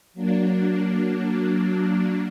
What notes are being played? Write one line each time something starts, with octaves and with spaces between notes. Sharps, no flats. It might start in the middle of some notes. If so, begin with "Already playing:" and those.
F#3 A#3 D4